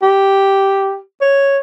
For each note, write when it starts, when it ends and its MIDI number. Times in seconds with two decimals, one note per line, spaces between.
0.02 0.97 67
1.21 1.58 73